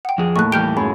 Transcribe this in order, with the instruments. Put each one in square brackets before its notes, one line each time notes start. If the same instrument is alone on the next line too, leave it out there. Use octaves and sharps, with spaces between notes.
[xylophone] F#5 G5
[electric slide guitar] F2 F3 G#4
[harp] D#2 A2 D#5 [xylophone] C#6 F#6
[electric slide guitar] E3 G3 G4 [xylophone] F6 G6 D7
[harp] F#2 [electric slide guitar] G#3 [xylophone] B5